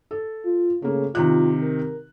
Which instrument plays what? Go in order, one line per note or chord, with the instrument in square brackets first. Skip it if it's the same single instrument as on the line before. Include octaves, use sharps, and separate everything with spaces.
[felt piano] A4
[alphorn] F4
[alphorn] C#3 [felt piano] A3 A#3
[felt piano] C3 D#3 F#6 [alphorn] F4
[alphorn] A#4